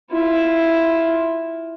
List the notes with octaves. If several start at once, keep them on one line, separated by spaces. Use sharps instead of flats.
E4 F4